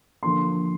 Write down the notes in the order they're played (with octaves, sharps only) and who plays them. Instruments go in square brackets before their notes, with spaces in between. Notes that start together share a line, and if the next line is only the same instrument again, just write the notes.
[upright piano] D3 F3 A#3 C6